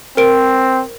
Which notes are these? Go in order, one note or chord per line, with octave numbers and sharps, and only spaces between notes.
C4 A#4 C5 D7